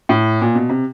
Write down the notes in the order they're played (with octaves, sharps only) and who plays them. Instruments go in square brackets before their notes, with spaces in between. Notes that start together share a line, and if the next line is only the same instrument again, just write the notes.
[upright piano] A2
A#2
B2
C3